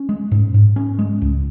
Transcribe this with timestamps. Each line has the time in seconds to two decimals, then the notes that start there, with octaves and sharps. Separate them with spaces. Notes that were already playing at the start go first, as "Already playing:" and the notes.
Already playing: C#4
0.09 G#3
0.32 G#2
0.54 G#2
0.76 C#4
0.99 G#3
1.22 C#2